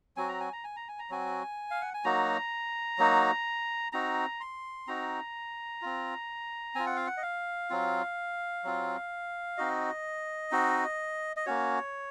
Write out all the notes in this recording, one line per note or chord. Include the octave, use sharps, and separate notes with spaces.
F#3 C4 F#4 G#5
A#5
G#5
A#5
G#5
A#5
G#5
A#5
F#3 C4 F#4 G#5
F5
F#5
G#5
F#3 A#3 D#4 F#4 A#5
F#3 A#3 D#4 F#4
C4 D#4 F#4 A#5
C6
C4 D#4 F#4 A#5
C4 F4
C4 F4 G#5
F#5
F5
F#5
D#5
F5
F#3 C4 F4
F#3 C4 F4
C4 D#4 F#4 D#5
C4 D#4 F#4
D#5
A#3 C#4 F#4 C#5